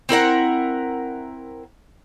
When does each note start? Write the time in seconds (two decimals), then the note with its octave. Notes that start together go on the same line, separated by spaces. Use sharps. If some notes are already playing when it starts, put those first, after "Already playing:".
0.09 C4 E4 A#4 F#5